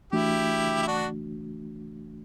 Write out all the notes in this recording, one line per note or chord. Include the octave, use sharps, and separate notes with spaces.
E3 A3 D4 E4 F#4 G4
E4
D4 F#4